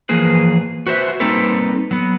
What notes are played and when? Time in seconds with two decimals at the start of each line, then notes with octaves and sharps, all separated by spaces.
0.09 E3 F3 A#3 G#4 B4
0.87 F#4 B4 C5 E5
1.20 G3 A#3 C4 D#4 A4 B4
1.91 F#3 B3